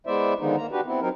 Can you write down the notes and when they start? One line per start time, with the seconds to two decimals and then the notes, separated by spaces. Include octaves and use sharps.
0.07 G#3 B3 E4 C5 D5 E5
0.39 D3 D#3 F3 G#3 B3 D#4
0.57 A#3 A#5
0.72 D4 F#4 G4 B4
0.86 B3 C4 E4
1.01 F#3 C4 D#4 A#4